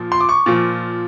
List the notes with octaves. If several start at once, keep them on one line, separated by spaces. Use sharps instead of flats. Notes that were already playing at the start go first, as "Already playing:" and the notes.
Already playing: A#2 F3
C6
D6
C#6
A#2 F3